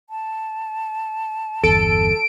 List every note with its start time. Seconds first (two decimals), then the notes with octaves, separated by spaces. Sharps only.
0.10 A5
1.63 G1 E2 A4 D7